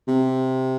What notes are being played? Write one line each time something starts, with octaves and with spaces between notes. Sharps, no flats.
C3